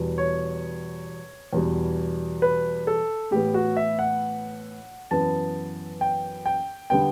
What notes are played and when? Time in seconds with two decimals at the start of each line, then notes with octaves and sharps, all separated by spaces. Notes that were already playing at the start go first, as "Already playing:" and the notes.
Already playing: E2 B2 G3 B3
0.18 C#5
1.53 E2 B2 G3
2.42 B4
2.87 A4
3.31 A2 E3 B3 G4
3.54 F#4
3.77 E5
3.99 F#5
5.11 F#2 E3 B3 A5
6.01 G5
6.46 G5
6.90 D3 G3 B3 G5